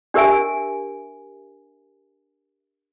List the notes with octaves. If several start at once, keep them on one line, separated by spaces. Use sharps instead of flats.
D4 G4 A#4 E5 G#5